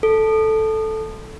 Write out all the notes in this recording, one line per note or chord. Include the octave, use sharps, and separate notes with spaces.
A4